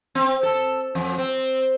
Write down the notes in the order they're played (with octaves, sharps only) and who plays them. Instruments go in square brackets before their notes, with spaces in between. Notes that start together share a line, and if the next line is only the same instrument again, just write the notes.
[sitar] C4
A4
F2
C4